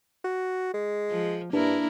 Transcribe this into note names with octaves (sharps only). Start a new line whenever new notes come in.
F#4
G#3
F3
G2 A#3 D4 E4 A#4